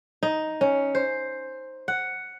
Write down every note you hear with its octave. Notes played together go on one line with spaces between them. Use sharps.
D#4
C#4
C5
F#5